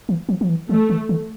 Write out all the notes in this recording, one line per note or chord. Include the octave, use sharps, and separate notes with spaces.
E3
F3
F3
E3
E3 A3
D#3
D#3